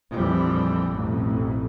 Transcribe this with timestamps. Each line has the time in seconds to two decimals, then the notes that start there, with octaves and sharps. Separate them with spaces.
0.13 A#1 F2 E3 F3 G3
0.90 A1 F2 B2